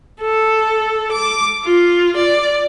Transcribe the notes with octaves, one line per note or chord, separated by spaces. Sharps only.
A4
D6
F4
D5